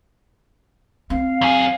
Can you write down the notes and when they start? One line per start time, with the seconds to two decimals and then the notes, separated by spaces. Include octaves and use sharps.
1.10 C4 F5
1.41 F#2 G#4